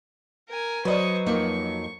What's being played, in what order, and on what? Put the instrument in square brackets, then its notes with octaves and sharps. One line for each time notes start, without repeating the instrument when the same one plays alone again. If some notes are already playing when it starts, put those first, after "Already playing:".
[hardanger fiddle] A#4 G#5
[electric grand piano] F#3 [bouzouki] B4 D#5 [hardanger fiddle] C5 C#6
[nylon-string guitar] F2 A#3 D#4 [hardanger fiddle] C#6